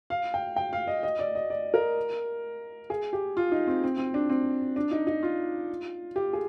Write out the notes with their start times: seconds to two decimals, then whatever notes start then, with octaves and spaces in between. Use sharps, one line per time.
0.10 F5
0.34 G5
0.56 G5
0.73 F5
0.87 D#5
1.03 D#5
1.19 D5
1.35 D#5
1.50 D5
1.74 A#4
2.90 G#4
3.13 G4
3.37 F4
3.52 D#4
3.67 C4
3.84 C4
3.98 C4
4.14 D4
4.30 C4
4.76 D4
4.91 D#4
5.07 D#4
5.23 F4
6.16 G4
6.33 G#4